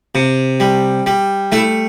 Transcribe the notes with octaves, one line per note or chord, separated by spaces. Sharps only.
C3
G3
G3
A3 E4